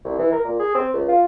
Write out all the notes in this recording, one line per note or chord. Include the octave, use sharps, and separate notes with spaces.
C2
E3
A#4
A#2
G#4
C4
C#2
F4